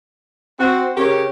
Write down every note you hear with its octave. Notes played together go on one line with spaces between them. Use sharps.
C4 F#4 C5
C#3 G4 A#4 C#5